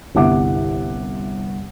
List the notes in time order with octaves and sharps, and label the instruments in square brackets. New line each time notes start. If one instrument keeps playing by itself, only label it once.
[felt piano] G1 C2 E5 F#5 D6